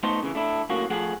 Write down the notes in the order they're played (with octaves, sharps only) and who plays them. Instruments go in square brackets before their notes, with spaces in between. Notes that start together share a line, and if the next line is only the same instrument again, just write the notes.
[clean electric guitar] A3 B3 D#4 A4 C5
C#3 E3
A3 D4 E4
F#2 A2 F#3 A#3 F#4
F3 A3 G#4 F#5